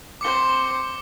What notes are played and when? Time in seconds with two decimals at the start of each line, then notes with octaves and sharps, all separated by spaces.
0.21 C4 C5 D6 C#7 G7